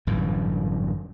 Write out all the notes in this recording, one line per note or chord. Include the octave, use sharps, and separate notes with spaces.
G1 F#2 A2 E3